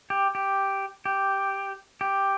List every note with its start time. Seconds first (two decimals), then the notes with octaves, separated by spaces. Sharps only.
0.10 G4
0.35 G4
1.05 G4
2.01 G4